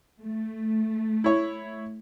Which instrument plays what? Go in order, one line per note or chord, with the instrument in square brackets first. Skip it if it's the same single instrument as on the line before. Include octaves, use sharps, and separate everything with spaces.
[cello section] A3
[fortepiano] E4 C#5